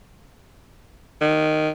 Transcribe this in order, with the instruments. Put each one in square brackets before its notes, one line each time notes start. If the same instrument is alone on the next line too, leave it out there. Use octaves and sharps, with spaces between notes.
[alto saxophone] D#3